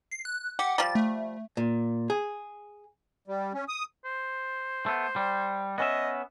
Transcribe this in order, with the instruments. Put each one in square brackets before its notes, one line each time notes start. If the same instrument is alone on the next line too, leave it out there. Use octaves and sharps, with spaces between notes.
[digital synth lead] C7
F#6
[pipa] G4 [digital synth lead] F#5
[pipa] F3 G3 [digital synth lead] A6
[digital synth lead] A3
[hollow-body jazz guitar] A#2
G#4
[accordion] G3
C#4
D#6
[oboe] C5
[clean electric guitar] A3 B3
G3
[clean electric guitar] B3 C#4 E5 [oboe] D#5